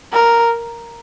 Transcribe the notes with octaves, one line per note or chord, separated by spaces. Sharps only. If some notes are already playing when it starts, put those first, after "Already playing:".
A#4